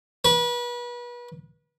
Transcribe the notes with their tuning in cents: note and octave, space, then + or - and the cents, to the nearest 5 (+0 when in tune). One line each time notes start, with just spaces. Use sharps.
B4 -35